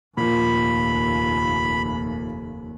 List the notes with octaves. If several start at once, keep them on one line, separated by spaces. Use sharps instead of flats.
F1 D#2 A#2 F3 B5